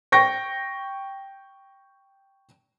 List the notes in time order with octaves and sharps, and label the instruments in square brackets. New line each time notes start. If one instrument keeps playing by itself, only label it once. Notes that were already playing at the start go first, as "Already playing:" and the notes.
[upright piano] G5 C#6 A#6